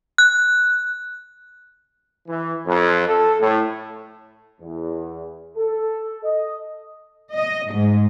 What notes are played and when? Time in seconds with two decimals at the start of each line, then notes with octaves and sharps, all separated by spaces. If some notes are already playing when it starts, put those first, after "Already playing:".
0.18 F#6
2.28 E3
2.66 F2
3.07 A4
3.40 A2
4.61 E2
5.57 A4
6.24 D#5
7.34 D#5
7.74 G#2